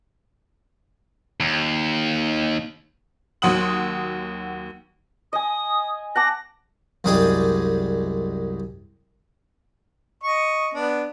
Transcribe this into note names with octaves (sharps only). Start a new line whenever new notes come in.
D#2
D#2 F#3 F#4 C6 D#6 F#7
D#5 G#5 D#6
F#5 A5 D6 A#6
C2 F#2 G#3 G#4 D5 G5
D#5 C#6
B3 D4